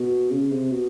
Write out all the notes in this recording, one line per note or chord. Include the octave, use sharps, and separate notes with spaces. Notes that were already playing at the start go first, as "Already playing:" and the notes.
Already playing: B2
C#3
C3
B2